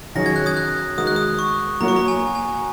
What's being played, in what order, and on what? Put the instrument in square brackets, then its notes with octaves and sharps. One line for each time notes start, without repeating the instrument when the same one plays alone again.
[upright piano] D#3 F#3 C#4 G#4 C#5 [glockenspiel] A#6
[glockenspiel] G#6
F#6
D#6 G#6
F#6
[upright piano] D#3 G#3 F#4 A#4 [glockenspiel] D#6
[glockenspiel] F#6
D#6
C#6
[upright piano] F#3 A#3 F#4 C#5 [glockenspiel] A#5
[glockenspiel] C#6
A#5
G#5
G#5